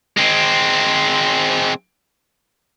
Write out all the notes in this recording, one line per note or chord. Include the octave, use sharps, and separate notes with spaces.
G#3 C4